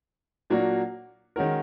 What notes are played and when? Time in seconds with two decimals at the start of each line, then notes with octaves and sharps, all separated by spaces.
0.50 A#2 F#3 A#3 D4 F#4
1.36 D#3 G#3 C#4 F#4 A#4